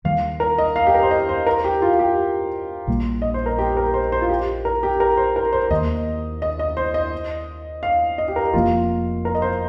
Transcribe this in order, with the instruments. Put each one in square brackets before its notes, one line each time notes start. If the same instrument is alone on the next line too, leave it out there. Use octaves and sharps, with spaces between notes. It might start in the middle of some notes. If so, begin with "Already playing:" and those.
[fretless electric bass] D#2 D#3 G3 [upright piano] F5
[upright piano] A#4
D#5
F5
G4
A#4
C5
D#5
C5
A#4
G4
F4
G4
[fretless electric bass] A#1 A#2 G3 A#3
[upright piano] D#5
C5
A#4
G4
A#4
C5
C5
F4
G4
A#4
G4
A#4
C5
A#4
C5
[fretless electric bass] D#2 D#3 A#3 [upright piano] D#5
[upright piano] D#5
D#5
C5
D#5
F5
D#5
G4
A#4
[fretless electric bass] F1 F2 F3 A#3 [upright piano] F4
[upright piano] A#4
D#5
C5